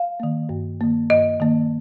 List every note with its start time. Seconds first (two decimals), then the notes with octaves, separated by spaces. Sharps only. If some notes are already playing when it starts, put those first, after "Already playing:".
Already playing: F5
0.20 D#3 A#3
0.49 G2
0.81 D#3 A#3
1.10 G2 D#5
1.40 D#3 A#3